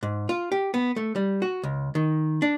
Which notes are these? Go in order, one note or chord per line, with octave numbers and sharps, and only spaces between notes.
G#2
F4
G4
B3
A3
G3
F#4
C#2
D#3
D4